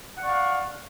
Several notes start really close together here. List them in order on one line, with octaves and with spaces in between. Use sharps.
F#5 D5 C#6 F5